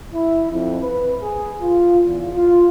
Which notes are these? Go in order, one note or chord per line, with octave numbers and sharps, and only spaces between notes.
E4
F2
B4
G#4
F4
E2
F4